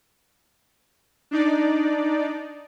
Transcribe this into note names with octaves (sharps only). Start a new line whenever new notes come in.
D4 D#4 D5